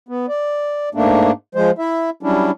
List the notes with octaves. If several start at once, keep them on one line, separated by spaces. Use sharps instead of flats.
B3
D5
G#2 A3 A#3 D4
F3 G#3 C5
E4 E5
F#3 G3 C#4 D4 E4